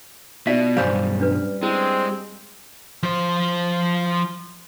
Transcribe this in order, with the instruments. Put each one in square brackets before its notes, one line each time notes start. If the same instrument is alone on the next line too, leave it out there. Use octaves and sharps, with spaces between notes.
[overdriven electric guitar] B2 [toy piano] D#4 F4 D5 [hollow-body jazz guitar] E5
[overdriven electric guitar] B1 G2 [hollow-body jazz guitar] G3 C5 [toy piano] F5 G#5
[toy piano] C#4 D4 B4
[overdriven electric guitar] G#3 [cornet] C4 [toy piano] E4
[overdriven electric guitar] F3 C5